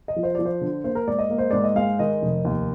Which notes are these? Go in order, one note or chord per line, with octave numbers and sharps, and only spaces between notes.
D#5
F3
C5
F3 D5
C5
D3
A#3 C5
A#4
G#2 D5
D#5
A#3
C5
G#2 D5
D#5
G#3 F5
D#3 D#5
F1
D#2